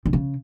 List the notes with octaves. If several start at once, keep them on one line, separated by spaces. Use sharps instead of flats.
D3
C#3